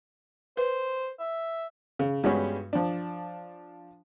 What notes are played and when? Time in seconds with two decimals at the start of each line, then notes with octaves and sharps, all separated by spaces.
0.57 B4 C5
1.20 E5
1.99 C#3
2.24 G2 G3 G#3 B3 C#4 F#4
2.73 F3 D4